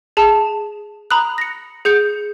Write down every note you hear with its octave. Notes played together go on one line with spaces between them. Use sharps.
G#4 A5
A#5 B5 D#6 F#6
A#6 C#7
G#4 G6 C#7